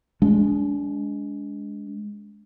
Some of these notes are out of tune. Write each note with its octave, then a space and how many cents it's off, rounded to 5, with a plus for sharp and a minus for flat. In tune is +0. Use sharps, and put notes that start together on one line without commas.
G#3 +0 D4 -35